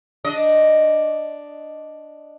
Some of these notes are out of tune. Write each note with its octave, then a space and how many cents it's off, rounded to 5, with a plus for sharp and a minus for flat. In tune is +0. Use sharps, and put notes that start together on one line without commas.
D4 +0 D#5 +0